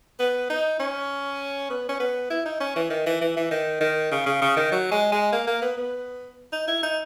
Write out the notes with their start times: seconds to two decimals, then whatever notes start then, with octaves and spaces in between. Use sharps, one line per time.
0.19 B3
0.50 D#4
0.79 C#4
1.70 B3
1.89 C#4
2.00 B3
2.30 E4
2.45 D#4
2.60 C#4
2.76 E3
2.90 D#3
3.06 E3
3.21 E3
3.36 E3
3.51 D#3
3.81 D#3
4.12 C#3
4.26 C#3
4.42 C#3
4.56 D#3
4.72 F#3
4.91 G#3
5.12 G#3
5.33 A#3
5.47 A#3
5.62 B3
5.77 B3
6.52 D#4
6.68 E4
6.83 D#4